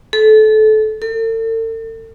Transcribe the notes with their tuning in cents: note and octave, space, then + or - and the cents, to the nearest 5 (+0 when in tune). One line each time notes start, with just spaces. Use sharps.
A4 -25
A4 +40